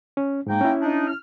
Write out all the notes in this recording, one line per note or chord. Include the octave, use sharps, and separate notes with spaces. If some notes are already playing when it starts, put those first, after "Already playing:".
C#4
G#2 G#3 A#3 D#4 G5
C#4 E4
D4 D#4
F6